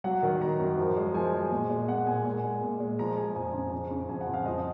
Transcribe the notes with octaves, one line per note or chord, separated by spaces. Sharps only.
F#3 F#5
D#3
F#3 A#5
F#2
F3
G#3
F3 G#5
G#3
A#2
G#3
A#2 F#5
A#2 G#5
G#3 G#5
G#3
A#2
G#3
F3 A#5
G#3 G#5
F2 G#5
C#3
F2
C#3
F2 G#5
F#5
F2
F5
F3 D#5